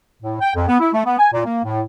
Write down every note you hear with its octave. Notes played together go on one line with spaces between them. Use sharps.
A2
G5
F2
B3
E4
A3
B3
G#5
A#2
A#3
A2